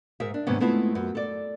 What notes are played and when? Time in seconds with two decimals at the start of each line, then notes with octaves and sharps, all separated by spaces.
0.20 G#2 G#4 A#4 E5
0.34 D4
0.47 D#2 G#2 C3 G3 B3 C#4
0.60 G#3 A3 B3 C4 E4 F4
0.95 F#2
1.15 A4 D5